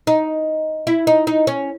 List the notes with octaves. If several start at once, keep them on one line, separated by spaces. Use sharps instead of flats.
D#4
E4
D#4
D#4
C#4